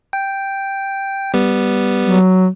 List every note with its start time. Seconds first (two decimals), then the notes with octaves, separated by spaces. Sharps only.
0.13 G5
1.34 G3 B3
2.02 F#3